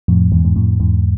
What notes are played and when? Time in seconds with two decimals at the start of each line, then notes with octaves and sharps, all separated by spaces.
0.08 F2 A2
0.32 E2 G#2
0.45 G#2
0.56 F2 A2
0.80 E2 G#2